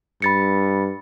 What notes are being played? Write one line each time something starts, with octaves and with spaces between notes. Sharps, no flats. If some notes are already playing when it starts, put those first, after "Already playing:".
G2 B5 A6 C#7